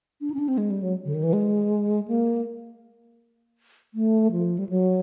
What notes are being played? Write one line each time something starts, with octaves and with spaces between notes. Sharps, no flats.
D4
D#4
C#4
D4
C4
G#3
G3
F#3
D3
D#3
E3
G#3
A#3
A3
F3
G3
F#3